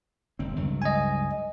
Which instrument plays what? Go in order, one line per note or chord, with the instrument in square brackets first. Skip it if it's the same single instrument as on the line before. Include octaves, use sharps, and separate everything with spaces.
[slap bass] G1 C4
C#2 G2 F#3
[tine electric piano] D#5 G#5